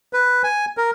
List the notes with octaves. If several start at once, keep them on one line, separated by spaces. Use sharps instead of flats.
B4
G#5
A#4